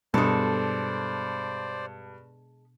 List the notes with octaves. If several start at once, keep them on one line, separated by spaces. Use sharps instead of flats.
G2 B2 G#3 D4 A4 C5 D5